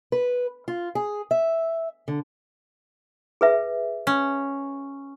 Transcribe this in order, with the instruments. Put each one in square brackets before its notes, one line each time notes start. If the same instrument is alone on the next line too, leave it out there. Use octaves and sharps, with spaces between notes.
[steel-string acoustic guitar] B4
F4
G#4
E5
D3
[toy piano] G#4 B4 E5
[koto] C#4